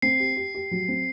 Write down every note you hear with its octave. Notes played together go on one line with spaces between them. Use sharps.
C4 C7
G4
G4
G4
F#3
C4